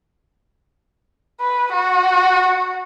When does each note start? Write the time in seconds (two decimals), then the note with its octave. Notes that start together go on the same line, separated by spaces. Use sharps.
1.40 B4
1.72 F#4